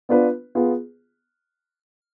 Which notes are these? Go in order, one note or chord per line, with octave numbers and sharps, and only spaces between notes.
B3 D4 F4 B4
B3 F4 G#4